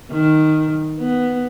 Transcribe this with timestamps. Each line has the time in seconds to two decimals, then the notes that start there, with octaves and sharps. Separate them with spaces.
0.12 D#3
1.00 B3